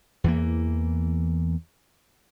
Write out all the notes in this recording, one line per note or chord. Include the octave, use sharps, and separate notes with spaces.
E2 E3 A#3